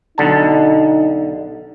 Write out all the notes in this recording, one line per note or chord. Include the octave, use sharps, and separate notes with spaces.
B1 D3 D#4 A5